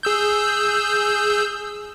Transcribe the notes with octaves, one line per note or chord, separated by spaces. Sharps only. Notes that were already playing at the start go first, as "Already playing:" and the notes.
G#4 E6 G6